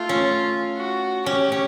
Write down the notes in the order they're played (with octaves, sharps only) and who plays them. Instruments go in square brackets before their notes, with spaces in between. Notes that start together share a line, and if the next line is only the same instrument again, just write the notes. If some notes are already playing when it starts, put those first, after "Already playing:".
Already playing: [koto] A3 [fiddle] F4
[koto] C#4
[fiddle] F#4
[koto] C#4 [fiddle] G4
[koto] C#4